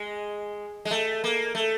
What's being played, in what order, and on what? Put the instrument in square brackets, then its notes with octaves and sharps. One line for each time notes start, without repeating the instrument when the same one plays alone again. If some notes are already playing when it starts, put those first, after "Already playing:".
Already playing: [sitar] G#3
G#3
A3
A#3
A3